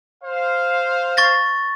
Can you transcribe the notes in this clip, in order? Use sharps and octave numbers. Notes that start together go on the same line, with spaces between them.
C5 F5
C#6 A6 A#6